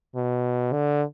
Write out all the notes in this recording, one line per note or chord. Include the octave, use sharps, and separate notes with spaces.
B2
D3